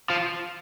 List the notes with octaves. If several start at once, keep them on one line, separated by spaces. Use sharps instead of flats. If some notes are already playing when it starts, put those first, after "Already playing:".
F3